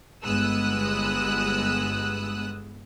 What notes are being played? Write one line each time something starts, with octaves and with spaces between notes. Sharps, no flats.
G1 G#3 B3 D#6 E6 F#6